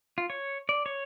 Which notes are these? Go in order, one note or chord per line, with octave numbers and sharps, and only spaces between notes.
F4
C#5
D5
C#5